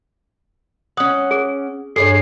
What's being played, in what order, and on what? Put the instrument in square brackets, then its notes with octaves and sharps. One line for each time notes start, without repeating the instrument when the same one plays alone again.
[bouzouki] C#4 F#5 [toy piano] D#6
[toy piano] G#4
[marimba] G2 D4 [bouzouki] G#4 C5 C#5 [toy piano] A4 [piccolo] C7